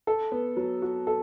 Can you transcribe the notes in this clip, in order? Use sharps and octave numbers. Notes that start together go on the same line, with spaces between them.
A4
B3
F#3
F#4
A4